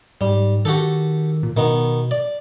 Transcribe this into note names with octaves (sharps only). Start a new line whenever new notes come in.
G#2 G3
D#3 F#4 G4 A4
A#2
B2 D#3 B3
D5